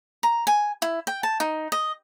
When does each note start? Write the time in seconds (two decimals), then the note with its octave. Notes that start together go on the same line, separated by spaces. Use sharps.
0.23 A#5
0.47 G#5
0.82 E4
1.07 G5
1.23 A5
1.40 D#4
1.72 D#5